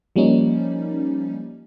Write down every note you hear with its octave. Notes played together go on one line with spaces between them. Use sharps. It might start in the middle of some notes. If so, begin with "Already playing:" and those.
F3 G3 A#3 C#4 D#4